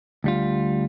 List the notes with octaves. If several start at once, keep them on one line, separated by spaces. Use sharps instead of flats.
D2 G3 F4